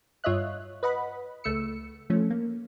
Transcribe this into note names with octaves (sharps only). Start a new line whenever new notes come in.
G2 F4 C#5 D#5 E5 F#6
B4 D#5 F#5 B5
C#2 A3 E6 C#7
F3 A3 C#4
A#3